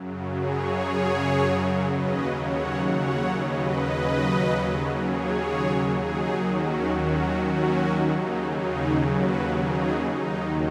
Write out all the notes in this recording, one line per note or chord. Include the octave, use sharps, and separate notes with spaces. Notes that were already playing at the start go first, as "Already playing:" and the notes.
Already playing: F#2 C#3 F#3
G#4 C#5
D#2 C#3 F#3 B4 D#5
C#5 F#5
C#5 F#5
B4 D#5
D#2 C#3 F#3
G#4 C#5
D#2 D#3 F#3 D#4 G#4
C#4 F#4
C#4 F#4
C#4 F#4
D#2 C#3 F#3 D#4
D#4 G#4
F#4 B4
D#4 G#4
D#2 D#3 F#3 D#4